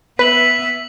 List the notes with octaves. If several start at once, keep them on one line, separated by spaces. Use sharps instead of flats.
B3 B4 E5 B6 F#7